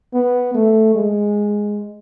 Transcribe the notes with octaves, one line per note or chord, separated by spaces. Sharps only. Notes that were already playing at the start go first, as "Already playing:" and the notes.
B3
A3
G#3